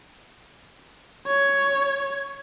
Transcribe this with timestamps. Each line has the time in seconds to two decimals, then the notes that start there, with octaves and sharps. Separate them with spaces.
1.27 C#5